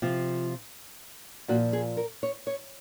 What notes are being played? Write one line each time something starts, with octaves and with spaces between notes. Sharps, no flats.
C3 F3 F4
A#2 F3 F#4
G#4
A#4
C#5
C#5